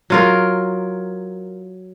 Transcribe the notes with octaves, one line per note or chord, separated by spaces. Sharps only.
F#3 F4 A#4